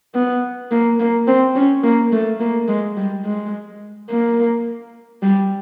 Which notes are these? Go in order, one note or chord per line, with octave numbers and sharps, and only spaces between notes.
B3
A#3
A#3
C4
C#4
A#3
A3
A#3
G#3
G3
G#3
A#3
G3